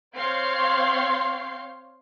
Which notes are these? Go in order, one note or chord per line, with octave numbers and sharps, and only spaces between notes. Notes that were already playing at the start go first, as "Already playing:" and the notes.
C4 C#5 F5 C6 G6 C7